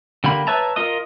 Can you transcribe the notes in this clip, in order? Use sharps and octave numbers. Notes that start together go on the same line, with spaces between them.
D3 G3 A#3 B5
B4 C#5 E5 A5 A#5
F4 A#4 D#5 D#6